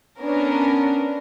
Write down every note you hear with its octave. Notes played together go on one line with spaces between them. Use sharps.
B3 C#4 D4 A#4